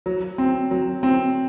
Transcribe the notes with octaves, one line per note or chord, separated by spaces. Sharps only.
F#3
C4
F#3
C4